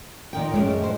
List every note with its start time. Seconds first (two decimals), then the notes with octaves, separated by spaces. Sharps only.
0.33 A#2 D#3 G5
0.54 F#2 A2 G#3 C#4
0.84 C5